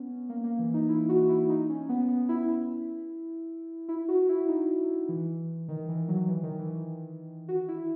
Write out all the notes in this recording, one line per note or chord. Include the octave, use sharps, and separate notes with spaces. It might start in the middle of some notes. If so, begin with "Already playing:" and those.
Already playing: B3 C#4
A#3
A#3
E3
D#4
E4
F#4
E4
D#4
C#4
B3
B3
E4
E4
E4
F#4
E4
D#4
E3
D#3
E3
F#3
E3
D#3
E3
F#4
E4